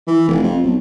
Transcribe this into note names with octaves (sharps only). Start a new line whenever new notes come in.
E3
F1
F2
B1